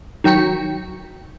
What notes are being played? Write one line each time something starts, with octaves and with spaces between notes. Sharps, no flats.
D#3 F#3 G5 B6 C#7